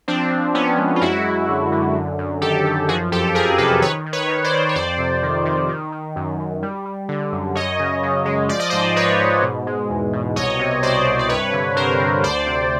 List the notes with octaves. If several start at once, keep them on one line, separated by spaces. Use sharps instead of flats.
F3 C4 D4
F3
F3 B3 C#4
G#3
F4
F#2 E4 F#4
F#2
D3
D3
F#2
F#2
D#3 G4 A4
F#2
F3 F#4 G#4
F2 G4 A4
F2 G#4 A#4
C3 A4 B4
D#3 B4 C#5
D#3
B4 C#5
D#3
C5 D5
D#3
C#5
F2 C5 D5
C3
D#3
D#3
D#3
D#3
F#2
F#2
G3
G3
D3
F#2
F#2 C#5 D#5
C#3
F#2
G#3
F3 D5
D#5
G#2 C5 D5
G#2 B4 C#5
G#2
B2
G#3
E2
B2
C2 C#5 D#5
C3
C2 C5 D5
C3
D5
G2 B4 C#5
D3
G2 A#4 C5
D3
D2 C5 D5
C3